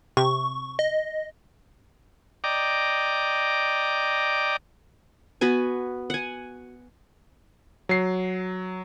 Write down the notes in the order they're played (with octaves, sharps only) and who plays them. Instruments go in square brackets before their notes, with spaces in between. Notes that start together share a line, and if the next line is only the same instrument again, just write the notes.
[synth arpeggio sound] C3 [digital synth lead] C#6
[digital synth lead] D#5
[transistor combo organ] D5 D#5 G5 A#5 D6
[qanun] B3 F#4 B4 G#5
F#5 G#5
[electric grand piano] F#3 C7